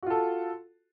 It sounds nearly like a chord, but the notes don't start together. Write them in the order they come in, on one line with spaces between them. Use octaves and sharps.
F#4 F4 A4